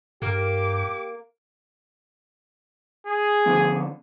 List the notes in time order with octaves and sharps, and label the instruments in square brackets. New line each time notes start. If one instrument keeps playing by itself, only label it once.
[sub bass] G2 [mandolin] A#3 A#4 F6 [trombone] G4 [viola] D6
[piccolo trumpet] G#4
[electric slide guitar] D3 F3 B3